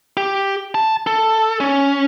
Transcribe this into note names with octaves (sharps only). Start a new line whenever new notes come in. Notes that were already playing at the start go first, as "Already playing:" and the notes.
G4
A5
A4
C#4